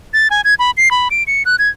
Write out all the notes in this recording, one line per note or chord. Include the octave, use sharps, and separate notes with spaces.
A6
G#5
G#6
B5
C7
B5
D7
C#7
F#6
G#6